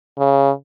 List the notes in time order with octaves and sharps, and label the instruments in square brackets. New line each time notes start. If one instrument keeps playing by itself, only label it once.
[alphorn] C#3